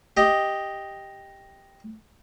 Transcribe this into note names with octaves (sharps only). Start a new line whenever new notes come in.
G4 D#5